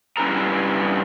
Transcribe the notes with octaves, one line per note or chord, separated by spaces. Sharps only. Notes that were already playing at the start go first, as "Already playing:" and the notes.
G2 C4 C#4 E4 A4 A#5